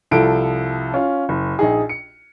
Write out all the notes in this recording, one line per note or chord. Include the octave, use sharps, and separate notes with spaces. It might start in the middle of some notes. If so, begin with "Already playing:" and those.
C2 F3 A4 D7
C#4 F4
F#1
A#1 D#4 G#4
C#7